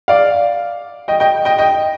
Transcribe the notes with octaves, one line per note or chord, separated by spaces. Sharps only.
D5 F5
D#5 G5
D#5 G5
D#5 G5
D#5 G5